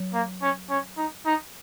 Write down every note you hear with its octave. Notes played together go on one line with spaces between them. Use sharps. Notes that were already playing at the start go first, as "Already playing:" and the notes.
Already playing: F#3
A#3
C#4
C#4
D#4
D#4